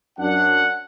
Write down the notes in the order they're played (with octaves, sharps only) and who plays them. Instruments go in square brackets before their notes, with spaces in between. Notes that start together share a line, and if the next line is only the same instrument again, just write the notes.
[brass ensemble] F#2 D4 F#5